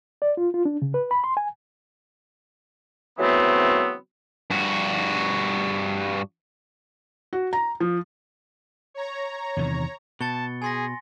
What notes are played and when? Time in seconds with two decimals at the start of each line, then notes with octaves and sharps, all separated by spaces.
0.22 D5
0.37 F4
0.54 F4
0.65 D4
0.82 C#3
0.94 B4
1.11 B5
1.24 C6
1.37 G#5
3.18 C#3 E3 F#3 A3 B3 C4
4.50 G2 F#4
7.33 F#4
7.53 A#5
7.80 F3
8.94 C#5 A#5
9.57 E2 C3 D#3
10.21 B2 A5 A6 C#7 G7
10.62 G#4 G#5 C6 A#6